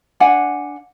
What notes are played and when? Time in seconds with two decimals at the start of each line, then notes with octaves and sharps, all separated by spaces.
0.20 D4 F#5 G#5